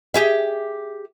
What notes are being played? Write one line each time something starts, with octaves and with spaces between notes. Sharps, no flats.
G4 G#4 E5